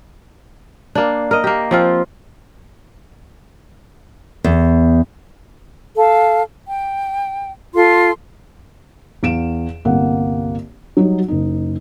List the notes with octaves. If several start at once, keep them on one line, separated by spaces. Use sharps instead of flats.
A#3 D4
A#4 D#5
A#3 G4
F3 C4 F4
E2
A4 F5
G5
F4 A4 C6
E2 F5 D7 E7
G1 C2 A#3 F#5
F#3 G3 D#4 F#4
F#1 D#4